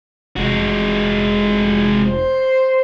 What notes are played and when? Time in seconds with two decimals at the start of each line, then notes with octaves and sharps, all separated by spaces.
0.36 F1 G#3 F#4
2.09 C5